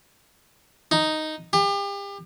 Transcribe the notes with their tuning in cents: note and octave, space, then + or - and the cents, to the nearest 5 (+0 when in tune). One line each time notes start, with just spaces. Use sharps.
D#4 +0
G4 +35